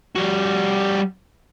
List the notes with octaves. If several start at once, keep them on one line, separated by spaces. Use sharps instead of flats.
G3 F#4